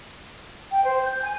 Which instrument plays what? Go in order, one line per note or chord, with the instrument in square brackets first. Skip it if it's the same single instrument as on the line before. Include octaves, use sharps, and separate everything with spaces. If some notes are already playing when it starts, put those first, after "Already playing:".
[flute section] G5
C5
G6
G#5